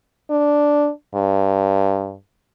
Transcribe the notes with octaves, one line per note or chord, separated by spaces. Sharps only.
D4
G2